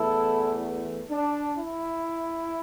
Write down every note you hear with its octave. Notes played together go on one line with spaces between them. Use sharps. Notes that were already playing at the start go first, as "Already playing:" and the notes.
Already playing: E2 E3 A3 E4 A4
D4
E4